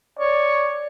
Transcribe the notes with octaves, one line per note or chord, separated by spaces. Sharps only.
C#5 D5